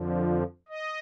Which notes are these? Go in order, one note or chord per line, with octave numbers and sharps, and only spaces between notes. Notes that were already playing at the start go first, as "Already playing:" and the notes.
Already playing: F2 D3 F3
D#5